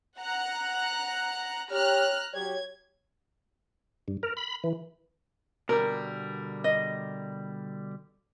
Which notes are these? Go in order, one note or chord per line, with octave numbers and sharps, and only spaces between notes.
F#5 A#5 F#6
G4 C#5 A#5 F6 F#6
F#3 G4 C#5 G#6
G2
A#4
B5
E3
B2 D3 G3 A#4
D#5